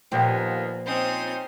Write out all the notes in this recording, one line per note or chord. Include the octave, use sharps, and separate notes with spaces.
D#2 A#2 D#3 F3 B3 G4
C4 C#4 D#4 C5 D#6